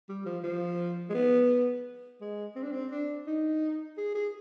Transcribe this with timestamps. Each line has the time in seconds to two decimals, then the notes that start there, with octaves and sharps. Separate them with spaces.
0.09 G3
0.26 F3
0.44 F3
1.10 G#3
1.14 B3
2.21 G#3
2.56 C4
2.63 D4
2.71 C4
2.91 D4
3.26 D#4
3.97 G#4
4.15 G#4